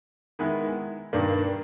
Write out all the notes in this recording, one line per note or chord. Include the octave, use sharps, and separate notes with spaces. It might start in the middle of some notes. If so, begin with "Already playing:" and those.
D#3 G#3 B3 E4
G2 D#3 G3 A#3 D4